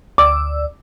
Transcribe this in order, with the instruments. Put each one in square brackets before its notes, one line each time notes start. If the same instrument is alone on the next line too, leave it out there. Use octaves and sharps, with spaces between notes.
[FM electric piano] D2 D5 E6 [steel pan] D6